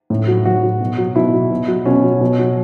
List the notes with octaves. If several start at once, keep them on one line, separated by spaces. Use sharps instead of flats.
A2
F#3
A2 F#4
F#3
B2
F#3
B2 E4
F#3
B2
F#3
B2 C#4
F#3
B2
F#3